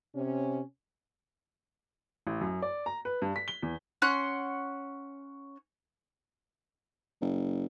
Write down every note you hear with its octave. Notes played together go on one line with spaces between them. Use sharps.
C3 C#4
A1
F#2
D5
A#5
B4
G2
B6
G7
E2
C#4 F#5 C6 F#6
F#1